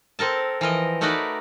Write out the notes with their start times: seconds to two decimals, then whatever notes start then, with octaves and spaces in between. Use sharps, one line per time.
0.19 C4 A4 A#4 A5
0.61 E3 F3 A#4 D#5
1.01 A3 D#4 F#4 A#4 B4 D5